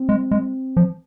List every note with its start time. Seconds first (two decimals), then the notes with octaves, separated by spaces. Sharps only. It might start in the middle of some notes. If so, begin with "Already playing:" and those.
Already playing: C4
0.09 G#3
0.31 G#3
0.77 F3